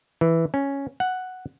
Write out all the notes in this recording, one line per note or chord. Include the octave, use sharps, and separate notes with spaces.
E3
C#4
F#5